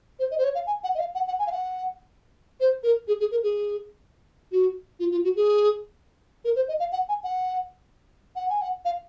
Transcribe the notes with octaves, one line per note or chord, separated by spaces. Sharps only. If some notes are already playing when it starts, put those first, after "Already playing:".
C5
D#5
C5
C#5
F5
G#5
F#5
D#5
F5
F#5
F#5
G#5
F5
F#5
C5
A#4
G#4
G#4
A#4
G#4
F#4
F4
F4
F#4
G#4
A#4
C5
D#5
F5
F#5
G#5
F#5
F#5
G#5
F#5
F5